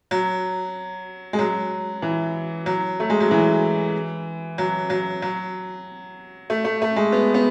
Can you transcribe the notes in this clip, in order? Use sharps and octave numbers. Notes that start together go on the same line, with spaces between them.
F#3
G#3
F#3
E3
F#3
A3
G#3
F#3
E3
F#3
F#3
F#3
A3
A3
A3
G#3
B3
B3